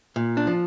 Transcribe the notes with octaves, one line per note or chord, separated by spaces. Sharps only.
A#2
D4
F3